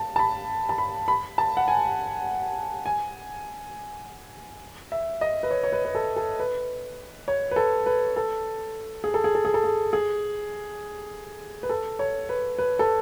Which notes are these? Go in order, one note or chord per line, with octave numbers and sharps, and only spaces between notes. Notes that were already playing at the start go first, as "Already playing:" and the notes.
Already playing: A5
A5
B5
A5
B5
B5
A5
F#5
G#5
G#5
E5
D#5
B4
C#5
C#5
B4
B4
A4
A4
B4
C#5
B4
A4
B4
A4
G#4
A4
G#4
A4
G#4
A4
G#4
G#4
B4
A4
C#5
B4
B4
A4